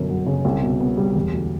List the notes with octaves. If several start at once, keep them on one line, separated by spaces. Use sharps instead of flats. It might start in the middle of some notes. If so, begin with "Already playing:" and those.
Already playing: G1 F#2 B2
F#3
C#3
C2
B2
B3
G3
E1
D2